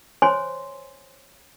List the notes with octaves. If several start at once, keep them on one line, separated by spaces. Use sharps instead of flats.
C5 C#5 G#5 C6